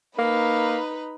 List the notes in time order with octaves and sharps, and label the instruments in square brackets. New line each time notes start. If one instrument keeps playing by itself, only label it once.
[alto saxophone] A#3 [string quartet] D#4 B4 B5